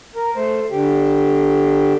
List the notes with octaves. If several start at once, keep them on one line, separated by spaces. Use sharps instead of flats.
A#4
A3 C5
D3 G4